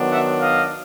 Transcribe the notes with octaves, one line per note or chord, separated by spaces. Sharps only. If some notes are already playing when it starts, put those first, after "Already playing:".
Already playing: D#3 F#3 B3 D4
E5 F#5
D#5 F5